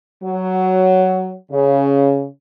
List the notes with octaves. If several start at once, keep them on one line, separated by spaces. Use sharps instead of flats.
F#3
C#3